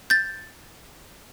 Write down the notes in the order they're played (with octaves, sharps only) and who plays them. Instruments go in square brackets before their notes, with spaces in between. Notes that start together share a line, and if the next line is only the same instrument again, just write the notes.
[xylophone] G6 A6